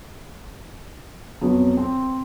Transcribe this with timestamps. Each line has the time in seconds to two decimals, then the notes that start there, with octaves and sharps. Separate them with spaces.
1.41 F2 F#3 B3
1.77 C4